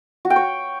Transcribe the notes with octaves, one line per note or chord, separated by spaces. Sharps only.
F#4
G5
C#5